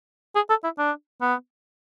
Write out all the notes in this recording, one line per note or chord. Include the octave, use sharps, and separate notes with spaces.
G#4
A4
E4
D4
B3